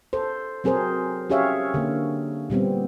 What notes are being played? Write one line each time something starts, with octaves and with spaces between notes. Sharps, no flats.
A4 C5
F#3 C4 G#4 A#4 C5
C#4 G4 G#4 C#5 E5 F5
D3 A#3
A#2 G3 B3 C4